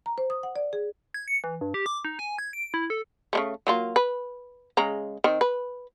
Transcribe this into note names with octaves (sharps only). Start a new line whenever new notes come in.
A#5
C5
D#6
F#5
D5
G#4
G#6
C#7
E3
G2
G4
D6
D#4
G#5
G#6
D7
E4
A4
C#3 G#3 A3
F#3 A#3 F4
B4
C#3 G#3 A#5
D#3 C4
B4